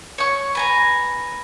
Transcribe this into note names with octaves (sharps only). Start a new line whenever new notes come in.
C#5 C#6
B4 G#5 A#5